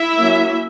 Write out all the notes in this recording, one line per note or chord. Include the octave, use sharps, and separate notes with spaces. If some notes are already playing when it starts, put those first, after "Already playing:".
Already playing: E4 E5
F#3 A#3 C#4